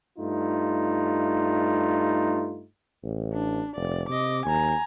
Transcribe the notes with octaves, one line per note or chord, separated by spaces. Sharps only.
G2 A3 D#4 F4
A1
D4
F1 D5
C3 D#5 D6
D#2 G#5 A#5